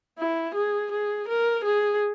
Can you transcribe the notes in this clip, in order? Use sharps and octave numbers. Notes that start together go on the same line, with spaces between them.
E4
G#4
G#4
A#4
G#4